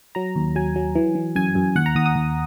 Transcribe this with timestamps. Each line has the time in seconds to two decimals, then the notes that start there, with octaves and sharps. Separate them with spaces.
0.15 F#3 A#5
0.36 D#2
0.55 F#3 G#5
0.76 F#3
0.95 E3
1.15 E3
1.36 F#2 G#5
1.55 F#2
1.75 D#2 F#5
1.86 A#5
1.95 D#2 D#6
2.06 D#6
2.16 D#2